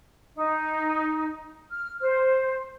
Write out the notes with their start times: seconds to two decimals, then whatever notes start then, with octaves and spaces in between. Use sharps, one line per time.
0.35 D#4
1.70 F6
2.01 C5